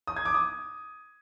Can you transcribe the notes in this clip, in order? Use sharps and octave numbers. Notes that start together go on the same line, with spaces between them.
D#6
G#6
D6
D#6